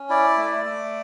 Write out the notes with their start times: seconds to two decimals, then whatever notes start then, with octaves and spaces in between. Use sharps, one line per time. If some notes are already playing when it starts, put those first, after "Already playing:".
Already playing: C#4
0.09 E4 D5
0.37 A3
0.65 A3